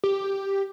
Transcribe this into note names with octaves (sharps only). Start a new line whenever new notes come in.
G4